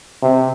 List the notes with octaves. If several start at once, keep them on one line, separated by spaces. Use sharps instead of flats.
C3